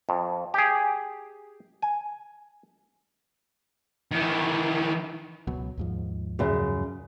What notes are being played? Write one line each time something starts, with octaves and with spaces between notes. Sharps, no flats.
F2
G4 G#4
G#5
D#3 E3
C#2 B2 F#3
D#2 G#2 F3
F#2 C#3